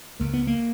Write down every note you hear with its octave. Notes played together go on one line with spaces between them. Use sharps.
C#2 A#3
B3
A#3